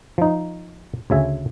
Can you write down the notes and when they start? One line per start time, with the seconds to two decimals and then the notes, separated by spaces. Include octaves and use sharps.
0.18 F3 D#4
1.10 D2 C#3 E5 G#5